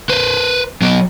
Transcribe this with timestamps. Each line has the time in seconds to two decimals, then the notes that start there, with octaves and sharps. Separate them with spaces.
0.09 B4 C5
0.82 F#3 B3